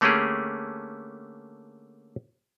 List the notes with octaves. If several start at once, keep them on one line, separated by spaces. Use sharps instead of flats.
D3 A3 A#3 C#4 G4 G#4